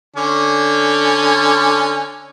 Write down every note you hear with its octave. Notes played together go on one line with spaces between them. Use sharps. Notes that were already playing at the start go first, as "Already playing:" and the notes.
D3 C#4